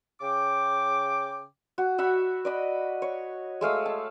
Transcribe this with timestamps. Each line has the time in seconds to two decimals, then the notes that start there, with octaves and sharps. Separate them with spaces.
0.21 C#3 G5 D6
1.78 F#4
1.98 F#4 E5 F#5 B5
2.45 D5 D#5 B5
3.02 C#5
3.61 G#3 A3 F5 E6
3.86 A5